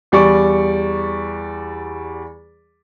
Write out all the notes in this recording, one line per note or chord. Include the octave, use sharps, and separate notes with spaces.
E2 G3 D5 C#6